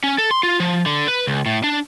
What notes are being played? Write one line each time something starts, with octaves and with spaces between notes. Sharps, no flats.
C#4
A4
C6
F4
F3
D3
B4
C#2
A2
D4